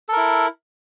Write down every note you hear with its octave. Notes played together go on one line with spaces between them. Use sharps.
E4 A4 A#4